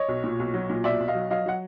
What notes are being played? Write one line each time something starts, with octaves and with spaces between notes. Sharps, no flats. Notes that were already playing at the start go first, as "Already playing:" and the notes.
Already playing: C#5 D#5
B1
A#2
B1
F#3
A#2
B1 D5 E5
B1
D#5 F5
F#3
F#3 D#5 F5
F#3 F#5